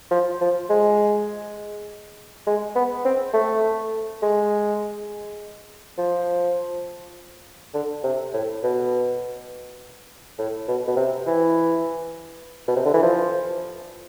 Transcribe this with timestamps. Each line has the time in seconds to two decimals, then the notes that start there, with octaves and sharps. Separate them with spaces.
0.11 F3
0.41 F3
0.70 G#3
2.47 G#3
2.76 B3
3.05 C4
3.34 A3
4.22 G#3
5.98 F3
7.74 D3
8.04 C3
8.33 A2
8.63 B2
10.39 A2
10.68 B2
10.87 B2
10.97 C3
11.26 E3
12.68 B2
12.76 C3
12.85 D3
12.94 E3
13.02 F3